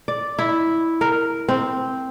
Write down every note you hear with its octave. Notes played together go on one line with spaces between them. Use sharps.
D5
E4
A#4
C4